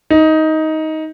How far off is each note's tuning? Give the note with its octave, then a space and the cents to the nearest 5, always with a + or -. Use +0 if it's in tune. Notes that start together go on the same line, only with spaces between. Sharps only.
D#4 +15